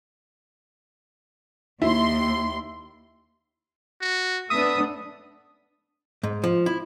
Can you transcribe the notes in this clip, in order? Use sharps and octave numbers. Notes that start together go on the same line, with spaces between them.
D#2 E4 C6
F#4
A3 B3 D4 E5 D#6
G#2
F3
E4